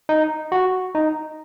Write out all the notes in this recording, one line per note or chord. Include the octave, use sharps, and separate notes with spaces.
D#4
F#4
D#4